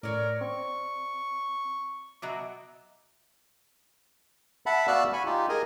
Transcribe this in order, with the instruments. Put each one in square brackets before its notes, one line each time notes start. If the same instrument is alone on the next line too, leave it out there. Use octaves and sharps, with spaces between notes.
[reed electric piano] A2 [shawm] A#4 [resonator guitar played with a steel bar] C#5 D5
[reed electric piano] C4 [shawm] C#6
[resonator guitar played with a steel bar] B2 F#3 F#4 [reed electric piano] D#5 E5 D6
[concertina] E5 F#5 A5 B5
B3 F#4 D5 F5 E6 F#6
G#5 B5 C#6
D#4 F4 G4
G#4 A#4 D#5 G#5